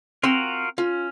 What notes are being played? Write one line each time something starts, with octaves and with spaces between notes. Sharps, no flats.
C4 F4 F#4 A#4 C6
C#4 F4